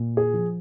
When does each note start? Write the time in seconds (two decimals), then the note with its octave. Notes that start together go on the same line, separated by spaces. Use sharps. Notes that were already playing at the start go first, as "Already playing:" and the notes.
Already playing: A#2
0.17 G#4
0.33 F3